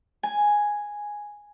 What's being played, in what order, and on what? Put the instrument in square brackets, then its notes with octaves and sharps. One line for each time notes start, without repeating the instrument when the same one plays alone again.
[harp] G#5